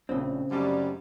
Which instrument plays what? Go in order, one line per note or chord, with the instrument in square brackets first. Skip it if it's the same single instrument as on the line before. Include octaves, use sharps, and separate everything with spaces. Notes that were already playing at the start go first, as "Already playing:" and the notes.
[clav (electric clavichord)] A#1 A2 [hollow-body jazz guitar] C#3 C4
[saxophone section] F#2 G3 [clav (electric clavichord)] D3 A3 D#4